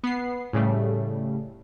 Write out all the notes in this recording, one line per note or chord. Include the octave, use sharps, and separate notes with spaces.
B3 C7
A2 C#3 G3 A3